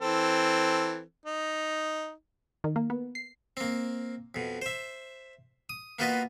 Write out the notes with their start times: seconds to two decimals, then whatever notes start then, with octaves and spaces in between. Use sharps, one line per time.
0.02 E3 C4 A4
1.25 D#4
2.64 D#3
2.76 A#3
2.90 B3
3.15 C7
3.57 A#3 C4
4.35 F2 B2
4.62 C5 E5
5.69 D#6
5.99 A#3 B3 F4 F#4 B4 D#5